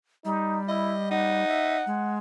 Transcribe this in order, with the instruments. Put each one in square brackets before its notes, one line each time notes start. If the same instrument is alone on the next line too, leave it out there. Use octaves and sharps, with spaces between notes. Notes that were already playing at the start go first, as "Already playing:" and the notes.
[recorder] G3 [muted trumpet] D#4
[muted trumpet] E4 [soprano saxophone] D#5
[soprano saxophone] D#4 [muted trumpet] F#5
[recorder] E5
G#3